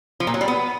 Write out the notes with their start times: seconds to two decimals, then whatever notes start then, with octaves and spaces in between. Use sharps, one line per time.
0.20 F3
0.27 A#2
0.34 F#3
0.41 G3
0.48 B3